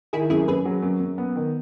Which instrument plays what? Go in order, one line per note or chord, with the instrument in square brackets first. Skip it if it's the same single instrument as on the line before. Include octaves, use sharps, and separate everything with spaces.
[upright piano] D#3 [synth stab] E4 G#4
[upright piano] F#2 [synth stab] E4 G#4
[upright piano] F#2 [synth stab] G#4 B4
[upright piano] F#3
F#2
F#2
B3
D#3